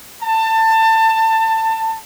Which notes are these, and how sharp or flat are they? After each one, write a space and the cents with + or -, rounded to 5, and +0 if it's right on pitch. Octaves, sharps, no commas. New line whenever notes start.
A5 +25